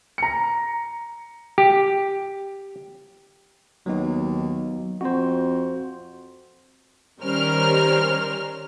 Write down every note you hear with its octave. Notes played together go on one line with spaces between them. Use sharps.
A#5 C#7
G4
D#2 F#3 B3 D#4
F2 F#4 C5
D#3 G3 C#4 A#4 C5 F6